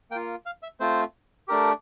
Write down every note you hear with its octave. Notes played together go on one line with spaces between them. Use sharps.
A#3 F4 G5
F5
E5
A3 C4 F4 C5
A3 D4 G4 A#4